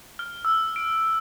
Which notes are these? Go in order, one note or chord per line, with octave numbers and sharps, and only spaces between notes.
F6
E6
D7